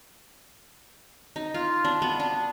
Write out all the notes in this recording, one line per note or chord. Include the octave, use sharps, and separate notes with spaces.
D#4
F4
D4
B3
D4